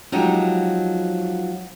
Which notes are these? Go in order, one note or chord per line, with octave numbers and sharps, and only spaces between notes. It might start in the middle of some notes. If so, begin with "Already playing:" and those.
F3 F#3 G#3 D#4 G4